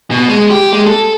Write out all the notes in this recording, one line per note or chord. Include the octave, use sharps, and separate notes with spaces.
B2
G#3
G4
G#3
A4